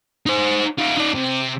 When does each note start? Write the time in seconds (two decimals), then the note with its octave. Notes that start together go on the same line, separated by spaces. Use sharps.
0.26 D#4 C5
0.78 D#4 F4
0.97 D#4 D5
1.14 C3